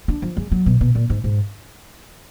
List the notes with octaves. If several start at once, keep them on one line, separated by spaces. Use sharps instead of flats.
D4
F3
G#3
F#3
B2
B2
A#2
G#2
G#2